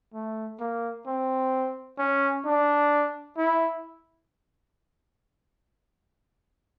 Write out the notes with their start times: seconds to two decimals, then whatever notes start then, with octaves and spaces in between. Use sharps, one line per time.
0.14 A3
0.60 A#3
1.07 C4
1.99 C#4
2.46 D4
3.37 E4